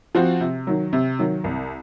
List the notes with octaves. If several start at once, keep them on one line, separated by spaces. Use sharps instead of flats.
F3 C4 F#4
C3
D#3 F#3
C3
D#3 F#3
C2